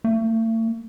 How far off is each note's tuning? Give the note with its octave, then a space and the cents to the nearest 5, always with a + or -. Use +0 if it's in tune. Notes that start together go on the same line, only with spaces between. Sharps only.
A3 +40